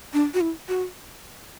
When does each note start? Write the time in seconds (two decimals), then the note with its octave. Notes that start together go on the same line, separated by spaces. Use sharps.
0.13 D4
0.34 F#4
0.41 E4
0.69 F#4